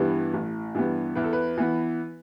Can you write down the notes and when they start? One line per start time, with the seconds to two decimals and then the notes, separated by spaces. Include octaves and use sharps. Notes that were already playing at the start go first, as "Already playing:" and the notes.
Already playing: G2 E3 G3 B3
0.34 A1
0.75 G2 E3 G3 B3
1.15 E2 B4
1.24 A4
1.33 B4
1.58 E3 B3